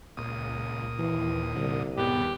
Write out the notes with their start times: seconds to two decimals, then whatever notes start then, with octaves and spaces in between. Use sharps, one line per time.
0.17 C#2 A#2 D#6
0.99 D#2 E3
1.56 C2 D3
1.97 D#2 G#2 B2 B3 G4